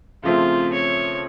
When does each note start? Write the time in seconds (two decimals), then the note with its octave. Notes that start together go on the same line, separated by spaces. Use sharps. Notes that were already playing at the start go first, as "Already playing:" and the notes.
0.23 C#3 F3 A3 C4 F4
0.73 C#5